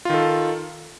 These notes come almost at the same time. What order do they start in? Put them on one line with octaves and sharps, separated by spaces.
F4 D#3 A4